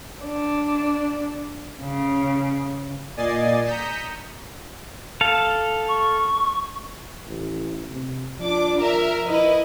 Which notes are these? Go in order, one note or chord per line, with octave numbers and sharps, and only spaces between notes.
D4
C#3
A#2 D5 D#5 G#5 A6 C7
A#5 D#6 G6 B6 C#7 E7
A4 F5
C#6
A1
C3
F3 D4 D6
A#4 E5
E4 B4 D#5